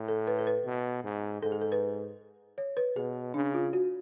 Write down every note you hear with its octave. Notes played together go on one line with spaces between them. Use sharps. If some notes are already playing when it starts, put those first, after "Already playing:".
Already playing: A2
A4
B4
A4
B4
B2
G#2
G#2 A4
G#4
A4
B4
C#5
B4
B2 G#4
C#3 D4
F4
F#4